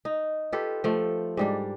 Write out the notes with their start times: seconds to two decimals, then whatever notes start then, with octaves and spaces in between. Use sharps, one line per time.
0.05 D#4
0.52 F4 G4 A4 B4
0.84 F3 A3
1.37 G#2 G3 D4